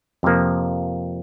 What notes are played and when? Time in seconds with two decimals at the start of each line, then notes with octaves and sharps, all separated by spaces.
0.23 F2 C3 F3 A#3